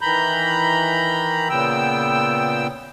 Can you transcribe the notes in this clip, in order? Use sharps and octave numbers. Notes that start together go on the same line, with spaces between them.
D#3 E3 A#5 B5 G6
A#2 C#3 B3 G5 E6